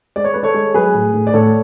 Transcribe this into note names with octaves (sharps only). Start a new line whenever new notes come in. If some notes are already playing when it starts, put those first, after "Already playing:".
G#3 D5
C#5
G#3 B4
A4 C#5
G#3
F#3 G#4 B4
A2
A2
D5
A2 A4 C#5